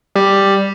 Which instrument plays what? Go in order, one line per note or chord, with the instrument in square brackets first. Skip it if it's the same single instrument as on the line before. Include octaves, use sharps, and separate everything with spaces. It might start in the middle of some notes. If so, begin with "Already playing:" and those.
[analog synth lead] G3